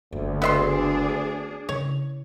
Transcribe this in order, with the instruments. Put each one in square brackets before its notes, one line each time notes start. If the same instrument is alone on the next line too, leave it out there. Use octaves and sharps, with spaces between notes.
[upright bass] F#1 [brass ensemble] D2
[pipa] B3 E5 C6 [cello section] D4 G#4
[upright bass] C#3 E4 [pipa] C#5